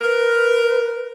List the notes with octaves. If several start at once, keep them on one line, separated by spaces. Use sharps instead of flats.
A#4 B4